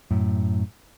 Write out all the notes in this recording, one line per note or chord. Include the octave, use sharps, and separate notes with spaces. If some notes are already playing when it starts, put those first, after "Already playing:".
F#2 A2